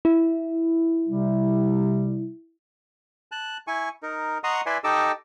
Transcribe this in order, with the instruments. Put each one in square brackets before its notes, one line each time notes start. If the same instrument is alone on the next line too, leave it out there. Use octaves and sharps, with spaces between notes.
[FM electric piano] E4
[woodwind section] C3 G3
[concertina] A5 F#6
E4 G#5 C#6
D#4 A#4
D#5 F#5 A#5 C6 C#6 D#6
E4 B4 D5 E5 G#5 C6
D#4 G4 A4 D#5 D6 E6